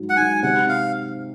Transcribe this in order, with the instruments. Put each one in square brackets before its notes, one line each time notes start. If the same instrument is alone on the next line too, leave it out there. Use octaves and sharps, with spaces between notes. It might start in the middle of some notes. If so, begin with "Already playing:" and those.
Already playing: [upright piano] G#2 F#3
[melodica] F#5
[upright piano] G#2 [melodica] G#5
[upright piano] C3 [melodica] F#5
[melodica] F5